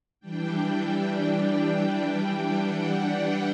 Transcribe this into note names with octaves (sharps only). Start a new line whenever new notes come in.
E3 G3 D4 G5
F#5